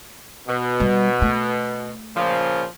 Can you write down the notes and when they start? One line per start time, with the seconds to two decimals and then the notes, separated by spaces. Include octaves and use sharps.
0.48 B2
0.80 G3
1.22 A3
2.16 A#2 C#3 F3